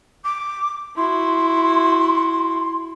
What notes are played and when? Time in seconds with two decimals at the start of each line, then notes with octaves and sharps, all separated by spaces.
0.24 D6
0.97 E4 F#4 C6